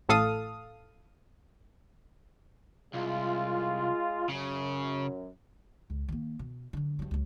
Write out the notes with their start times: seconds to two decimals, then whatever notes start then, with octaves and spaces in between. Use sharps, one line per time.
0.09 A1 A2 A4 F5 D#6
2.94 C2 G#3 F4
4.29 F#2 C#3
5.90 C#2
6.08 D#3 A#3
6.39 B2
6.73 D3 F#3
6.99 G2 F#3
7.11 C#2 F#3